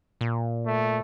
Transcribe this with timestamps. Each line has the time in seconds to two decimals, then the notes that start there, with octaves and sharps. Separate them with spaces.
0.21 A#2
0.67 A3